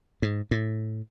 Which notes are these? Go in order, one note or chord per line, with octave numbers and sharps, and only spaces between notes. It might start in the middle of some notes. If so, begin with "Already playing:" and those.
G#2
A2